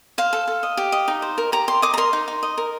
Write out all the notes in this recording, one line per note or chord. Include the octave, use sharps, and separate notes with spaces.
C5 F5
A4
A4
D#5
G4
D#5
D#4
C5
A#4
G4 A#5
G4 C6
D#5 D6
A#5
A#4 C6
D#4
D#4
D#5
A#4